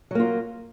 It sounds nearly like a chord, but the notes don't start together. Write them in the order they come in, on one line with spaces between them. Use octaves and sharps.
F#3 A#3 F4